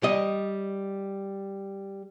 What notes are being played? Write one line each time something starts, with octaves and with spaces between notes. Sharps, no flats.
G3 D#5